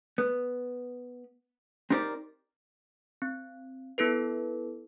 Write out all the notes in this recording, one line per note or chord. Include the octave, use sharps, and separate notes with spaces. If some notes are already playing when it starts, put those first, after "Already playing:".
B3
C4 D#4 G4 A#4 C5 D5
C4
B3 E4 A4 B4